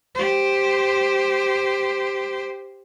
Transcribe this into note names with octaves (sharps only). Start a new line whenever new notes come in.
G4 C5